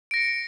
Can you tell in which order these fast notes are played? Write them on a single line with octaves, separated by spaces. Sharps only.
D7 A#6 C#7